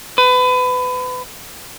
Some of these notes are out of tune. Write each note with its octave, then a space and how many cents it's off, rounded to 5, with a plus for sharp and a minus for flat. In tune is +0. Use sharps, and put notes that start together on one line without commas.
B4 +30